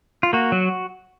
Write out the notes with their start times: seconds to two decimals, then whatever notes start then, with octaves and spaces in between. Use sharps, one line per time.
0.23 F4
0.33 A#3 F#4
0.52 F#3